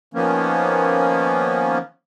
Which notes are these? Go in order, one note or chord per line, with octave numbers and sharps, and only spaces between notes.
D#3 F3 A#3 B3 C#4